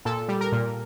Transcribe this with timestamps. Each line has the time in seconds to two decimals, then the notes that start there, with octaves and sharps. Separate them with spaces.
0.05 A#2 A4
0.28 G3
0.41 A#4
0.52 A#2